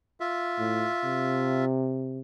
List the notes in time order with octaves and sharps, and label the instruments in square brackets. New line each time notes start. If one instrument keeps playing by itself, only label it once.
[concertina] F4 E5
[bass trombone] A2
C3